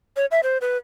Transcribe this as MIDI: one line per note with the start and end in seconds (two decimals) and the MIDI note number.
0.16 0.26 73
0.31 0.40 76
0.43 0.58 72
0.61 0.77 71